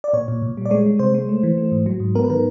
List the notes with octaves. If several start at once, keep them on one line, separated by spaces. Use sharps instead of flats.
D5
A#2 C#5
A#2
A#2
G3
D5
G#3 C#5
G#3
C3 C5
G#3
A3
E3
A3
G#2
F#3
G#2
B3 A#4
B4
D#3 A#4